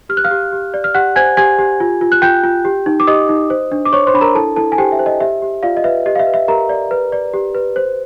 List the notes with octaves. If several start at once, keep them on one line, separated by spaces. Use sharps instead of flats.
G4 F6
F#6
F5 F6
G4
G4
D5
F6
G4 F#5 F#6
C5 G#5 G#6
G4 G#5 G#6
G4
F4
F4
F#6
F4 G5 G6
F4
G4
D#4
D6
G4 D#5 D#6
D#4
C5
D4
D6
C5 C#5 C#6
C5 C6
D4 B5
A#4 A#5
E4 A4 A5
E4 A4 A5
G#5
G4 C5 G5
E5
C5
D#5
G4 E5
G4
F4 D5 F5
D#5
B4 E5
G4 D#5
F5
E5
B4
E5
G4 A#4 A#5
D5
B4
D5
G4
B4
C5